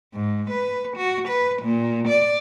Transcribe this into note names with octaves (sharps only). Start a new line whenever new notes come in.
G#2
B4
F#4
B4
A#2
D5